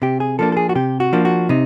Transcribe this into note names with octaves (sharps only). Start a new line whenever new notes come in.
C3 G4
G#4
F3 A#3 D4 A4
A4
G#4
F#4
C3 G4
F#4
F3 A#3 D4
F#4
C3 D#4